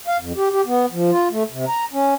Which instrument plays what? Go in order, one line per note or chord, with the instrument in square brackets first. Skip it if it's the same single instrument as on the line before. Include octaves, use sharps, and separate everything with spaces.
[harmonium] F5
F2
G4
G4
B3
F3
F4
A3
C3
A#5
C#4